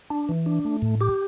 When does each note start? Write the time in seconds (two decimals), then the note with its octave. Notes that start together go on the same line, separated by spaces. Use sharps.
0.10 D4
0.29 E3
0.46 D4
0.65 A3
0.82 A2
1.01 G4